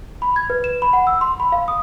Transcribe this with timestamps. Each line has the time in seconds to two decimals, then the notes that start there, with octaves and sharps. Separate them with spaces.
0.22 B5
0.36 G#6
0.50 B4
0.64 E7
0.82 B5
0.93 F#5
1.07 E6
1.21 C6
1.40 B5
1.52 F5
1.68 D#6